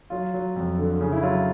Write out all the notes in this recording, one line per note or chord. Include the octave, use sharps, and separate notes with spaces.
F#3 F4
F#3
F2
D3
C#3
E4
F#3 F4